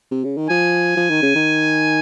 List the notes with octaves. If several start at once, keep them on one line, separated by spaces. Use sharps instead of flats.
C3
C#3
D#3
F3 G#5
F3
D#3
C#3
D#3